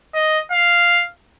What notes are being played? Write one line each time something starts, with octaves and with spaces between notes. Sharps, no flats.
D#5
F5